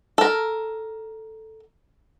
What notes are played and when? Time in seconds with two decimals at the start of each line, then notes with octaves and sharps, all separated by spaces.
0.18 A4 A#4